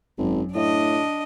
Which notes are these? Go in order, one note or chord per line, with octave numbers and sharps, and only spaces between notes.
G#1 F#2
A2 D4 D#5